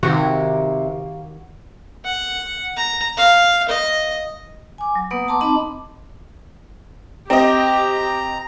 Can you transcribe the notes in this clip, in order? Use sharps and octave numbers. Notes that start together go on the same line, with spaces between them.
C3 D#3 A#3 F#4 G4
F#5
A#5
F5
D#5
G#5 D6
F#3
A#3 B3 B4 F#5 D#6
A5 A#5 C6 D6
C4 D#4 D#5 A5 B5 D6
C4 G4 D#5 A#5